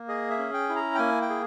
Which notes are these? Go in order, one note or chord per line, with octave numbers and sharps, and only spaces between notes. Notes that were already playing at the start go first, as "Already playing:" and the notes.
Already playing: A#3
G#4 D#5
E5
C#4
G5
E4
A#5
G5
A#3 G#5
G5
G#4